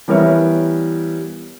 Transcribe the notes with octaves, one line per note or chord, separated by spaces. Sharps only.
E3 G3 B3 A#4 C#5 E5